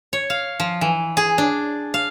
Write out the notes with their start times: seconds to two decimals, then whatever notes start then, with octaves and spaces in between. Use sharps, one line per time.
0.13 C#5
0.30 F5
0.60 F3
0.81 E3
1.17 G#4
1.38 D4
1.94 F5